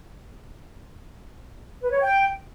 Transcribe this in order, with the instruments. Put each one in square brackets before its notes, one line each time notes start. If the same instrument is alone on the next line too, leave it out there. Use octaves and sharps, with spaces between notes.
[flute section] B4
C#5
G5